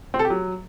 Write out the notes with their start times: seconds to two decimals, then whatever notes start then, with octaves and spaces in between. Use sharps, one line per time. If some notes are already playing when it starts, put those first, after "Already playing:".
0.14 C4
0.19 A4
0.25 G4
0.30 F#3